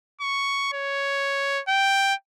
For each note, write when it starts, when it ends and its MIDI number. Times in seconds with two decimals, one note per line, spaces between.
0.21 0.71 85
0.73 1.61 73
1.68 2.14 79